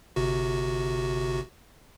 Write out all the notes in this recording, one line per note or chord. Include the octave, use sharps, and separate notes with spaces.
G1 C3 F#4